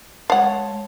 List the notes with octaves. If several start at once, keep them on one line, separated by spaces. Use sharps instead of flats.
G#3 C#5 F5 F#5 A5